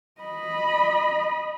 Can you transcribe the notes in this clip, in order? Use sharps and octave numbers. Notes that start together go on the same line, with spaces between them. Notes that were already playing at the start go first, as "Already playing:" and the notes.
D#5 B5